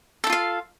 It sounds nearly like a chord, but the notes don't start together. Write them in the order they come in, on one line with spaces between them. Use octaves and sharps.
A4 E4 F4 F5